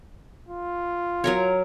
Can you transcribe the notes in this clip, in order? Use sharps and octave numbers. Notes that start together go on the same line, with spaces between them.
F4
F#3 A#4 C#5